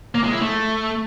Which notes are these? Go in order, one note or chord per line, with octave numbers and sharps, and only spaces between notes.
A#3
G#3
E4
A3